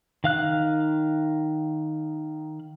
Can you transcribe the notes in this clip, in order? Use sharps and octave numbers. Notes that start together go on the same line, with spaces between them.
D#3 F5 F#6